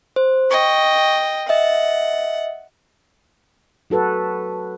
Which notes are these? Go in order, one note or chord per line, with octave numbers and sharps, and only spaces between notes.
C5
D#5 G5 C#6
D#5 E5 F#5
F#3 F#4 A4 B4